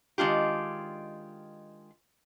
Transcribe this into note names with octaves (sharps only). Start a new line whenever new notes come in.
D#3 G#3 D4 F4 G4